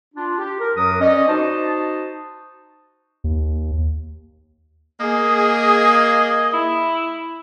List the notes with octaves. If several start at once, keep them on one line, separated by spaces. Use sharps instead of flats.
D4 F4
G4
A#4
F#2 F#3 A#4 B4 D#6
C#4 D5 D#5
D#4 F#4 C5 A5
D#2
A#3 G#4 D#5
E4